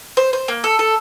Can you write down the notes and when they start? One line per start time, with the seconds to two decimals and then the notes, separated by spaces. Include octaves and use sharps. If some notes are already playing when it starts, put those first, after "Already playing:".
0.17 C5
0.33 C5
0.48 A#3
0.64 A4
0.79 A4